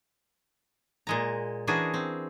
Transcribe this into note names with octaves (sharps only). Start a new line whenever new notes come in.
A#2 G#3 A#5
E3 C#4 D4 F#4 G#4 A#4
C4